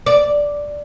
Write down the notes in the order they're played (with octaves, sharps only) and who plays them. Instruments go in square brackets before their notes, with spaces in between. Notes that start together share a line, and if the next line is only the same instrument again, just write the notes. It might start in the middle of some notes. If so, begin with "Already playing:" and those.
[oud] D5